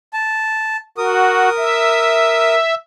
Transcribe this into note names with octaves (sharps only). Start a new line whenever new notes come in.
A5
F#4 A#4 D#6
E5